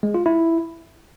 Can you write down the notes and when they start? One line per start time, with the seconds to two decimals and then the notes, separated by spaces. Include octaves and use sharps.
0.03 G#3
0.14 F4
0.26 E4